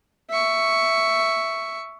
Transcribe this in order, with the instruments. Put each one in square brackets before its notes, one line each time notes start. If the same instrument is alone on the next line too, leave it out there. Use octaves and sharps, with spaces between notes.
[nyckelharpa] E5 C#6